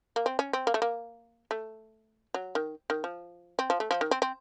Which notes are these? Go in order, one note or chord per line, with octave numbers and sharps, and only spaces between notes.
A#3
C4
C#4
C4
A#3
A3
A#3
A3
F#3
D#3
D#3
F3
C4
F3
A3
F3
D#3
C4
C4